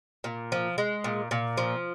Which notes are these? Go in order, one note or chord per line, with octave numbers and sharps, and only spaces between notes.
A#2
F3
G#3
A#2
A#2
F3